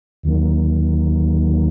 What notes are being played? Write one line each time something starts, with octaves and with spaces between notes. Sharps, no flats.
D#2 D#3 F#3 A#3